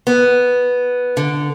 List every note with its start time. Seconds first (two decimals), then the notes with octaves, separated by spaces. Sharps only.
0.07 B3
1.17 D3